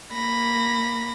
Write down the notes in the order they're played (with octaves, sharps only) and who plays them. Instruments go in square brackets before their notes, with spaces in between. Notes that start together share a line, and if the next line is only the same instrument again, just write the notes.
[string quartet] A#3 B5 A#6